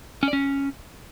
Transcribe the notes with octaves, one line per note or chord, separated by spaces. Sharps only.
C#4
D5
C#4